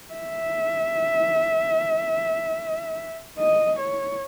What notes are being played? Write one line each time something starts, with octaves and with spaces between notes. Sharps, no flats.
E5
D#5
C#5